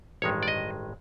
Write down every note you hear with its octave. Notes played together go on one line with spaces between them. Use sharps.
A1 G2 D#3 G#3 C#5
D5
D#5